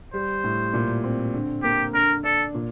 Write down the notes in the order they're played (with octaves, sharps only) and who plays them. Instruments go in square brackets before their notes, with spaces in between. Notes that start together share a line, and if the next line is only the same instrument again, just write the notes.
[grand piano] G3 [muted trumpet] C5
[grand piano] A2
A#2
C4
D3
[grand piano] A#3 [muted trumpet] G4
[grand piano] D3 [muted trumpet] A#4
[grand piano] D4 [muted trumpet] A4
[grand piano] A#2